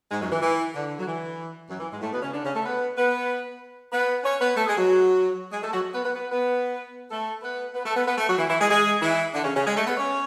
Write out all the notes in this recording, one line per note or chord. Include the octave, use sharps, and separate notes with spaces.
G#2 G#3
F#2 F#3
E3
E3
D3
F#3
E3
F#2 F#3
E3
G#2 G#3
A2 A3
B2 B3
C#3 C#4
D3 D4
C#3 C#4
A3 A4
B3 B4
B3 B4
B3 B4
C#4 C#5
B3 B4
A3 A4
G#3 G#4
F#3 F#4
G#3 G#4
A3 A4
F#3 F#4
B3 B4
B3 B4
B3 B4
B3 B4
A3 A4
B3 B4
B3 B4
A3 A4
B3 B4
B3 B4
A3 A4
F#3 F#4
E3 E4
E3 E4
G#3 G#4
G#3 G#4
E3 E4
D3 D4
C#3 C#4
C#3 C#4
G#3 G#4
A3 A4
B3 B4
C#4 C#5